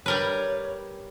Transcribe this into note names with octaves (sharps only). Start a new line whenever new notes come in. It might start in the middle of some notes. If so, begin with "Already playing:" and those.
G3 A#4 B4 C#5